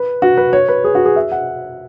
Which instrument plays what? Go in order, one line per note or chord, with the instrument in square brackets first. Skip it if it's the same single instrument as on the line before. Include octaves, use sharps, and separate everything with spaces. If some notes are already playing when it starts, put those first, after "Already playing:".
Already playing: [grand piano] B4
F#4
B4
C#5
B4
G#4
F#4
G#4
E5
F#5